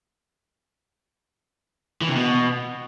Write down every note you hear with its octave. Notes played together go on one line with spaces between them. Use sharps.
E3
C3
B2